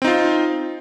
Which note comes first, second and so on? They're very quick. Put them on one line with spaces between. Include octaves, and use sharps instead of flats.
C4 D#4 F4